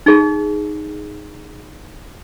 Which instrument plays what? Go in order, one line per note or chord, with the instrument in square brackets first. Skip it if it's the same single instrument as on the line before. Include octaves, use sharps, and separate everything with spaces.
[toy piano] D#4 G#4